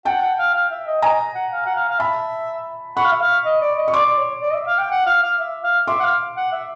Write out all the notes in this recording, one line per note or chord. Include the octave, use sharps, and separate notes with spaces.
F#5 G5 A5
F#5
F5
F5
E5
D#5
D#5 G#5 A#5
F#5
F5
F#5
F5
F5
E5 A5 B5
F#5 B5 C#6
F5
E5
F5
D#5
D5
D#5
C#6
D5 C6 D6
D5
C#5
D5
D#5
E5
F5
G5
F#5
F5
F5
E5
F5
E5 C6 D6
F#5
F5
F#5
E5